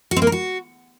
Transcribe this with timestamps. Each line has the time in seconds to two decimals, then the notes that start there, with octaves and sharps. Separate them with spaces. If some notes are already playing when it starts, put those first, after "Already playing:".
0.11 F#4
0.16 C4
0.22 A#3
0.27 A#4
0.32 F#4